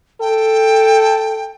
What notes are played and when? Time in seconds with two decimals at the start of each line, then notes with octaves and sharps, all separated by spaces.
0.21 A4 G5